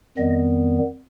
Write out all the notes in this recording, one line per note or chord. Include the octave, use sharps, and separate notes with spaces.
F2 D#3 G3 B3 D#5